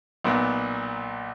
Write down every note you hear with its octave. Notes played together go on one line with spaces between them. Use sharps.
B1 A#2 B3